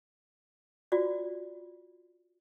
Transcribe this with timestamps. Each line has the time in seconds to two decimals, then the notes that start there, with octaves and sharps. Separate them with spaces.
0.92 F4 F#4 D5